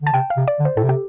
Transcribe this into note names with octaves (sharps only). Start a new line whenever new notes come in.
D3 A5
C3 G5
F5
C3
D5
D3
C5
A2 A4
C3
G4